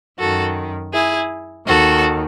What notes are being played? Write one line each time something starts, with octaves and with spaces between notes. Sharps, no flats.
F#2 D#3 F#4 A4
E4 G#4
D#2 D#3 F#4 A4